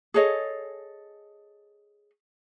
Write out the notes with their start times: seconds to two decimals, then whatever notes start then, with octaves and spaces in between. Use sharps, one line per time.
0.14 G#4 A4 C#5 D#5